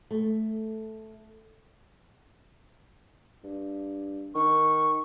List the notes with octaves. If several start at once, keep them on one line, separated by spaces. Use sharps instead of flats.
A3
G2
D#3 C#6